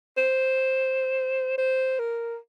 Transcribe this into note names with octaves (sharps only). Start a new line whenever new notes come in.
C5
C5
A#4